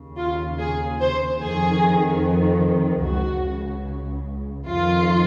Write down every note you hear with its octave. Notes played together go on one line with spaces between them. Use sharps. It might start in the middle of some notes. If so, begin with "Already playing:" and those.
Already playing: D#2 C#3
F4
G#4
C5
F2 D#3 G#4
C#2 C#3 F#4
F2 D#3 F4